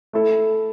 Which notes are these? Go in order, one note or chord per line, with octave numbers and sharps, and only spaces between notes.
A3 E4 A4